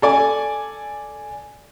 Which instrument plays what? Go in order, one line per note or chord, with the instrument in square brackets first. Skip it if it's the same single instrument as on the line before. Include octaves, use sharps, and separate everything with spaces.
[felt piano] A4 D5 G#5